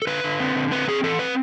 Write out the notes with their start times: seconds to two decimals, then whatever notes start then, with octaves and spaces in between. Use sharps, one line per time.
0.02 A4
0.07 D3 B4
0.24 D3
0.40 C4
0.56 D3
0.71 C4 B4
0.88 C4 G#4
1.03 E3 A4
1.19 C4 B4